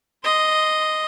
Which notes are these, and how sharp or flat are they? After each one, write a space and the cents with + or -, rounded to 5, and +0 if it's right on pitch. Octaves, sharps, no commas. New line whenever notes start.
D#5 +0 C6 +0